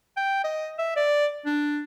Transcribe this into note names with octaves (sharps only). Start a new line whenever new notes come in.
G5
D#5
E5
D5
D4